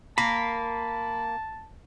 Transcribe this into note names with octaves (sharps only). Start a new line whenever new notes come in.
A#3 A5 B5